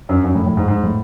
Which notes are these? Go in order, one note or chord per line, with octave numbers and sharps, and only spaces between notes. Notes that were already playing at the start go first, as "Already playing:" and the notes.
F#2
F#2
A2
A2
G#2
G#2
A2